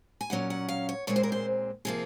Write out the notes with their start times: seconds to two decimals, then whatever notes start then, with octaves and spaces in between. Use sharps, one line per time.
0.21 G#5
0.30 A#2 F#3 C#4 F#5
0.50 F#5
0.68 F5
0.89 C#5
1.07 A#2 G#3 C4 C#5
1.16 C5
1.23 A#4
1.32 C5
1.85 C3 F3 A#3 G#4